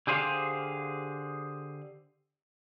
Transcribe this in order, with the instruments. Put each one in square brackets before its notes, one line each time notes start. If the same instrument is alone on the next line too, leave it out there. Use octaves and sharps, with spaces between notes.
[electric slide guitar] D3 G4 G#4 C5 D#5 F5